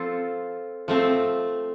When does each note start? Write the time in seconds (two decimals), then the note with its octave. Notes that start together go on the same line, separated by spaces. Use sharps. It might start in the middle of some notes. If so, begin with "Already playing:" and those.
Already playing: F3 C4 F4 A4
0.88 F3 A3 C4